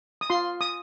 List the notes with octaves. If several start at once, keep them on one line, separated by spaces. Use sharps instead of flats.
D#6
F4 C6
D#6